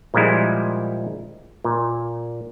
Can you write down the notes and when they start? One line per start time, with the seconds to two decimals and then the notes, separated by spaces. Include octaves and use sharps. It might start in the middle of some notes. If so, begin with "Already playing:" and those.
0.14 A#2 F3 G3 G#3 E4
1.64 A#2